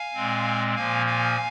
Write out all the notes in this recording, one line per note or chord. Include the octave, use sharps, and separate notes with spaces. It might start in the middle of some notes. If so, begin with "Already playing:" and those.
Already playing: F5 G#5
A#2 G#3 C4
A#2 F3 A#3 F5 G#5
F5 G#5